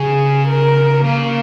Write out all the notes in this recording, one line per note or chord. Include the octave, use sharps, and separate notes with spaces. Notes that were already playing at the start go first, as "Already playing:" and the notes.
Already playing: C#3 G#4
A#4
C#3 A#3